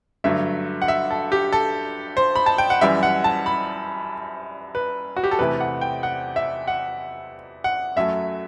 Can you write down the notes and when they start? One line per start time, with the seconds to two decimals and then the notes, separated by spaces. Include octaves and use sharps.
0.24 G2 D3 F#3 A3 E5
0.82 F#5
0.88 E5
1.11 A4
1.32 G4
1.52 A4
2.17 C5
2.36 B5
2.46 A5
2.58 G5
2.70 F#5
2.81 F#2 E3 G3 E5
3.03 F#5
3.24 A5
3.46 B5
4.75 B4
5.17 F#4
5.24 G4
5.31 A4
5.39 E2 C3 E3 A3 B4
5.60 F#5
5.81 G5
6.03 F#5
6.36 E5
6.68 F#5
7.64 F#5
7.96 F#2 F#3 A3 E5